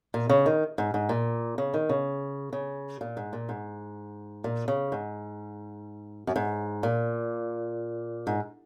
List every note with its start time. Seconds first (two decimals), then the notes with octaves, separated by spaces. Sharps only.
0.14 A#2
0.29 C#3
0.46 D#3
0.78 G#2
0.94 G#2
1.09 A#2
1.58 C#3
1.74 D#3
1.89 C#3
2.53 C#3
3.01 A#2
3.17 G#2
3.33 A#2
3.49 G#2
4.44 A#2
4.68 C#3
4.92 G#2
6.27 F#2
6.36 G#2
6.83 A#2
8.27 G#2